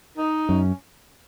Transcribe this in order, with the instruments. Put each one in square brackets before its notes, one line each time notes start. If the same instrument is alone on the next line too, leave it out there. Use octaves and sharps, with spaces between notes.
[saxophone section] D#4
[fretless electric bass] F#2 [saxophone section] C#4